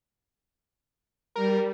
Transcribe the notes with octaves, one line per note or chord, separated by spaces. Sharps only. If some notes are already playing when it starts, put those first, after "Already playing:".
G3 A#4